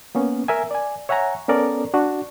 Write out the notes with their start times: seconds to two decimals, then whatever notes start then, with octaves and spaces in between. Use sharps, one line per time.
0.15 A#3 B3 C#4
0.48 A#4 E5 G#5
0.71 D5 G#5
1.09 C#5 E5 F#5 G#5 A#5
1.48 B3 C#4 A4 A#4 D5
1.94 D4 F#4